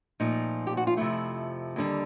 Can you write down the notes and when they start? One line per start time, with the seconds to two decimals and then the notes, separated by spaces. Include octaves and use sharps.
0.20 A#2 F3 A3 D#4
0.67 G4
0.77 F#4
0.87 F4
0.97 F2 C3 F3 A3 E4
1.76 D#2 D3 G3